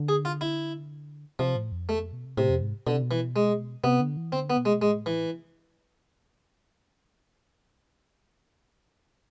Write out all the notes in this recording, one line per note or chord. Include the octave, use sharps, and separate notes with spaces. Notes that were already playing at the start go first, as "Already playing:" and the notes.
Already playing: D3
G#4
F4
E4
C3 F3
A2
F2
E2 A3
F2
B2
C3
A2 C3
F2
G#2
B2 D3
C3
B2
E3
G#3
C3 B3
D3
E3
D3 C4
B3
B2
G#3
A2 G#3
E3